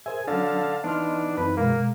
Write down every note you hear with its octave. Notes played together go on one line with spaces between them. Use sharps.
G#4 A#4 C5 E5 G#5
D3 F#3 C#4 D4 F5 A5
E3 B3 D4 D#4 D#5 C6 F6
F#2 E3 C4 D#4 B4
B2 G#3 A#3